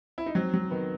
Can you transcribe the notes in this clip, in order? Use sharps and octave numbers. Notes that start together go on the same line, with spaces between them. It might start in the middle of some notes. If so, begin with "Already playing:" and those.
E4
D#4
F#3 C4
F#3
D#3 B3